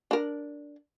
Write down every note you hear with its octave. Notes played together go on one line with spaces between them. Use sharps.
D4 A#4